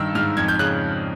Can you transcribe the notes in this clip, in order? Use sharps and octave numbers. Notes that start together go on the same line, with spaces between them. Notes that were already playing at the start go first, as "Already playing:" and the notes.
Already playing: G2 D#3 E6
G#2 F6
F2 G#6
G6
C#3 F#6